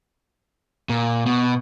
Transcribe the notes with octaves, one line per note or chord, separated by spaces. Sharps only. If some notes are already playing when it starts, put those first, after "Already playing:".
A#2
B2